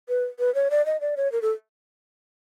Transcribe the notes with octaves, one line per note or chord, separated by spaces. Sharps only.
B4
B4
C#5
D5
D#5
D5
C#5
A#4
A4